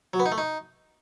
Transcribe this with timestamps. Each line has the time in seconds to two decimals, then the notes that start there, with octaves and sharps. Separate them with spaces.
0.14 F#3
0.20 B3
0.26 D#4
0.32 A3
0.38 D#4